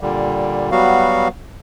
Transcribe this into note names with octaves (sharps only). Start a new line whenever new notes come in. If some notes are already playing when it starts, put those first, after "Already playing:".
A#2 D3 G3
F#3 G3 B3 F#4 F5